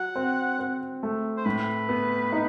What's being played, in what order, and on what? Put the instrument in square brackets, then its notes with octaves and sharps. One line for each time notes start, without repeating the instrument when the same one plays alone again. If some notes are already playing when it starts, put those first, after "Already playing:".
Already playing: [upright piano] F#3 [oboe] F#5
[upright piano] C4
C4
A3
[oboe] C5
[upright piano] A2 [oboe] B4
[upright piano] B3
D#4